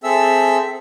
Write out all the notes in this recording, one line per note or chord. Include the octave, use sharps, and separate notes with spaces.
C4 G#4 A4 E5 E6